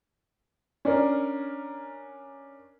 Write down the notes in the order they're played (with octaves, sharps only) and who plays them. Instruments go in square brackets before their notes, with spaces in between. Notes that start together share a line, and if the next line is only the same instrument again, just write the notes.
[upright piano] C#4 D4 A#4